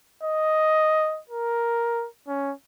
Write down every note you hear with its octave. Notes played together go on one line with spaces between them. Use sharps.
D#5
A#4
C#4